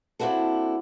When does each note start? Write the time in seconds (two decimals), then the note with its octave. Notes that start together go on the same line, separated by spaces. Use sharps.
0.19 A#3 C4 D4 E4 F#4 A4